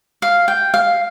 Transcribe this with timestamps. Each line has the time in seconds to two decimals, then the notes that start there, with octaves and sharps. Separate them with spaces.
0.22 F5
0.48 G5
0.74 F5